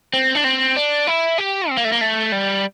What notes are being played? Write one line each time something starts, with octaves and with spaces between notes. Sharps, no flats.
C4
D4
C4
D4
E4
G4
C4
A#3
A3
A#3
A3
G3